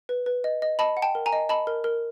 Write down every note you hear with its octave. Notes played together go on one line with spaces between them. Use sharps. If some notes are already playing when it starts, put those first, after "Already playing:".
B4
B4
D#5
D#5
D#5 A5 B5
F#5
G5 A5
A#4
G#5 A#5
D#5
D#5 A5 B5
A#4
A#4